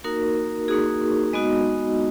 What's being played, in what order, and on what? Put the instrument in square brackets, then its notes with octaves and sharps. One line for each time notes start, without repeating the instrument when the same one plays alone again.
[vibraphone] A#3 D#4 F#4 A#4
A#3 D#4 F#4 G#4
G#3 B3 D#4 F#4 D#5